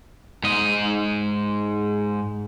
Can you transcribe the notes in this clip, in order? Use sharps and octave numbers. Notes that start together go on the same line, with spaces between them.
G#2 D#5